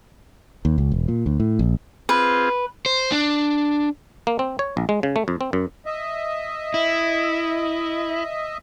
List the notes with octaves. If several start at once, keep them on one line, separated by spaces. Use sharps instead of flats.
D#2
C#2
E1
A#2
D2
A2
A#1
C4 F4 G#4 B4
C5
D4
A#3
C4
C#5
A#1
G#3
C#3
A3
F2
C4
F#2
D#5 E5
E4